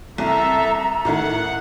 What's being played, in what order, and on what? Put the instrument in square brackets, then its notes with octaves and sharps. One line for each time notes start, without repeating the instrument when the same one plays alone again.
[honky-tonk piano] C2 [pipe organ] A4 E5 [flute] A#5
[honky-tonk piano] A2 D#3 E4 [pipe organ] F#5